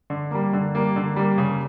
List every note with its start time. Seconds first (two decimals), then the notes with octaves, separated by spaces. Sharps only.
0.10 D3
0.31 G3 A#3
0.53 D3
0.75 G3 A#3
0.96 D3
1.16 G3 A#3
1.38 C#3